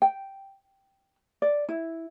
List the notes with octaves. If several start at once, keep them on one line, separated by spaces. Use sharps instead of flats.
G5
D5
E4